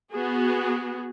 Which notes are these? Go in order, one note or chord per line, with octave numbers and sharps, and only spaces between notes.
B3 F#4 G#4